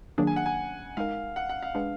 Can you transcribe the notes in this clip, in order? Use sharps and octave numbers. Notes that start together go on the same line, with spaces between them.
D#3 F#3 A#3 D4 G#4
G#5
F#5
G#5
G#3 D#4 A#4 F5
F#5
F#5
F5
G#3 D4 G#4 B4